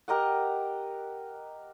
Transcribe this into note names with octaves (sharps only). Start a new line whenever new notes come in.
G4 A#4 D#5 F#5